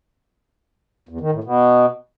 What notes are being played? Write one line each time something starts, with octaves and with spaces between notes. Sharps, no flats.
E2
D#3
A2
B2